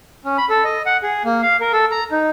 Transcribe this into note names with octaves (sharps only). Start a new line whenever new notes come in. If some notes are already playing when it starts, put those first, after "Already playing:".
C#4
B5
A4
D#5
F#5
G#4
A#3
F5
A#4
A4
A#5
D#4